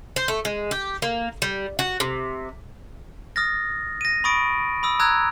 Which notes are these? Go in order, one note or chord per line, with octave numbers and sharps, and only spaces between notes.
C5
A3
G#3
G4
A#3
G3
F#4
C3
D#6 F6 A6 A#6
A#6 D#7
B5 C#6 D#6 A6 D7
B5 D#6 E6
A#5 D#6 E6 F#6 G#6